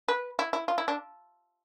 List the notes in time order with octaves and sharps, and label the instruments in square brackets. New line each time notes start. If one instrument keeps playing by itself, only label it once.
[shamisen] B4
E4
E4
F4
E4
D4